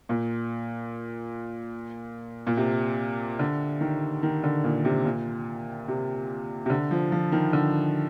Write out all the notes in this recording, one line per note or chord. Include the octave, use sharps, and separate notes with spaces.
A#2
A#2
C3
D3
D#3
D#3
D3
A#2
C3
A#2
C3
C3
D3
F3
F3
D#3
D3